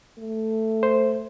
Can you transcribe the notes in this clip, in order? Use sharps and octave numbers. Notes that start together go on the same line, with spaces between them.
A3
C5